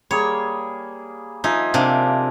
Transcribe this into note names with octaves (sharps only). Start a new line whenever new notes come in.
G3 A#3 G#4 C#5
F3 D#4 E5 G#5
C3 A#3 D4